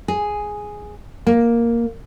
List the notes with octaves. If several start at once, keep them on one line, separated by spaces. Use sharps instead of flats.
G#4
A#3